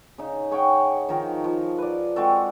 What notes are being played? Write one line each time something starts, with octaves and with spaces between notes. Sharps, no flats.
C#3 D#4
G#4 C#5 F#5 G5
D#3 F3 D#4 A#4
F3
B4 D5
G#3 C4 F#4 A4